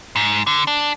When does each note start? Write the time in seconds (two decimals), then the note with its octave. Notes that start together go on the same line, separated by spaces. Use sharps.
0.16 G#2
0.47 D3
0.67 D4